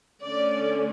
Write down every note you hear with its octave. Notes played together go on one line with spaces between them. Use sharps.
D3 A3 C#4 D5